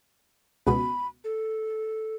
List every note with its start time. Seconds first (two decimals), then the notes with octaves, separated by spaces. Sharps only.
0.67 C#2 B2 B5
1.24 A4